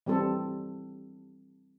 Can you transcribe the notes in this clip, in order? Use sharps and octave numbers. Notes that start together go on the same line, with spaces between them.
E3 G3 C4 A4